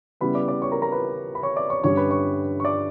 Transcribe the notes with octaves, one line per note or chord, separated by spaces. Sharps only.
C#3 G3 B3 E4 B4 B5
D5 D6
D5 D6
C#5 C#6
A#4 A#5
A#4 A#5
B4 B5
B5
C#5 C#6
D5 D6
C#5 C#6
G2 D3 G3 C#4 C#5 C#6
B4 B5
C#5 C#6
C#6
D5 D6